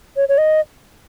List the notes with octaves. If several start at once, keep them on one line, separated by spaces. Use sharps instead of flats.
C#5
C#5
D#5